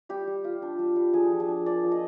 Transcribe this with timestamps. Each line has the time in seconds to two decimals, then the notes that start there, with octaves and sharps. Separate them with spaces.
0.09 G3 G4
0.27 G3
0.44 F4
0.62 D4
0.79 G3
0.96 G3
1.13 F3 G#4
1.32 F3
1.40 G#4
1.48 D4
1.66 A#3 D5
1.83 F3
1.92 D#5